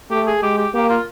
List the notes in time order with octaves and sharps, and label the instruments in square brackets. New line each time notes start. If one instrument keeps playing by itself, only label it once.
[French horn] A3 [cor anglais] G4
[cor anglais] G#4
[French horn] G#3 [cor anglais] G4
[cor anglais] G4
[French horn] A#3 [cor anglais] G4
[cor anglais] F4